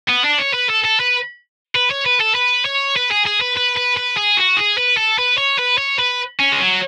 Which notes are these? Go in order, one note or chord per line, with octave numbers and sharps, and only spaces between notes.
B3
D4
C#5
B4
A4
A4
B4
B4
C#5
B4
A4
B4
C#5
B4
G#4
G#4
B4
B4
B4
B4
G#4
F#4
G#4
B4
A4
B4
C#5
B4
C#5
B4
C#4
G#3
F#3